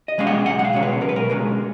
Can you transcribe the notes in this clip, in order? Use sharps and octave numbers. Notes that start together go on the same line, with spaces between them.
D#5
B2 G#3 C#4 F5
F#5
B1 F#5
F#5
F5
B2 G#3 C#4 C#5
B4
B1 A#4
B4
A#4
B2 G#3 C#4